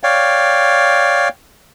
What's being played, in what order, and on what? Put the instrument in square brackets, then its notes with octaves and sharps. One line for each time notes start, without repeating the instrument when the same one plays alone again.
[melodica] C#5 D5 F5 G5